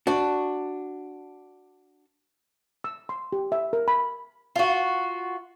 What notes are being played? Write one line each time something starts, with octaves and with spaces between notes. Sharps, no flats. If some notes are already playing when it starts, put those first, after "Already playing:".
D4 F#4
E6
C6
G4
E5
A#4
B5
F4 F#4